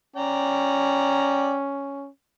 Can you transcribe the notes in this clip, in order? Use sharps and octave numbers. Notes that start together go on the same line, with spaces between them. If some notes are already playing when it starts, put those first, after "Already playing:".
C#4 D5 G5 A#5